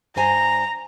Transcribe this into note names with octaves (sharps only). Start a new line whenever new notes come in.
G2 C5 G#5 A#5